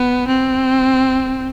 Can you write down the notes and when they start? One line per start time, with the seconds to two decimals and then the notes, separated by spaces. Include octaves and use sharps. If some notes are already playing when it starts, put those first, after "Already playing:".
Already playing: B3
0.28 C4